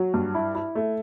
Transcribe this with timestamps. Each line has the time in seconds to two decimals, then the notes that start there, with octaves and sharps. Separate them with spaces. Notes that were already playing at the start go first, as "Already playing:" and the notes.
Already playing: F#3
0.14 G2
0.35 E4
0.55 E4
0.75 A3